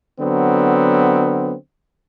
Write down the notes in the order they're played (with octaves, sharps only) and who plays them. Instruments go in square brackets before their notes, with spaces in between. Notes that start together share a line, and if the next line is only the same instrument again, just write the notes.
[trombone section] D3 F#3 B3 C4